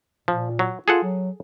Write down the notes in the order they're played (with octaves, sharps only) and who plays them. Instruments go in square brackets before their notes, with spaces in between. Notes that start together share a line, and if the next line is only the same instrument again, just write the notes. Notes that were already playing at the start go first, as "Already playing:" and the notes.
[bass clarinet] A#2 [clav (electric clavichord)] F3
[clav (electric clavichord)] F#3
[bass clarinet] F4 [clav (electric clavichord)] G#4 A4 F#5
[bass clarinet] F#3